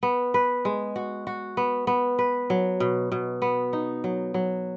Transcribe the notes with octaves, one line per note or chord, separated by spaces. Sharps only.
B3
B4
G#3
F#4
F#4
B3
B3
B4
F#3
B2
B2
B3
D#4
F#3
F#3